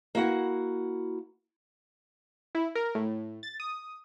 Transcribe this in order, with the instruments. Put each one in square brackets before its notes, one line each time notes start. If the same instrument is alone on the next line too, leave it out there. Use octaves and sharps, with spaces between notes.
[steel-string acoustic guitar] A#3 E4 F#4 F#5
[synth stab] E4
A#4
A2
A6
D#6